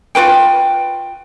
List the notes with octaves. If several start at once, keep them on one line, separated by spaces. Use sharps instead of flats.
F4 F#4 B4 G5